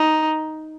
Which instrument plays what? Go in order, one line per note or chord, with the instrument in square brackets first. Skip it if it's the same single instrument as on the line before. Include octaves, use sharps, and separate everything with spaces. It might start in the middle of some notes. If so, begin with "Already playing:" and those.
Already playing: [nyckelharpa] D#4